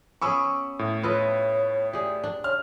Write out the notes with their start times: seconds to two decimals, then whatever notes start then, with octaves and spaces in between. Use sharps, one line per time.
0.22 B3 C#4 G#4 G#5 B5 C#6 D6 E6
0.79 A2
1.03 F4 A4 B4 C#5 D#5
1.93 G4 G#4 D5
2.24 D4
2.44 C#5 F6